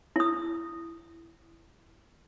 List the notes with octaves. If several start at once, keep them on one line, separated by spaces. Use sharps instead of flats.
E4 D#6